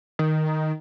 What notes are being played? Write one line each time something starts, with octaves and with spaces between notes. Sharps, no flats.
D#3